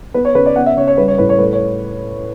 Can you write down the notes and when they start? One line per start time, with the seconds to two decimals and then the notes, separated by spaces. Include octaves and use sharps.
0.14 B3 B4
0.25 C#5
0.35 C#3 B4
0.46 D5
0.56 B3 F#5
0.66 E5
0.77 C#3 C#5
0.88 C#5
0.98 G3 B4
1.08 C#5
1.18 A2 B4
1.29 C#5
1.39 A3 B4
1.53 C#5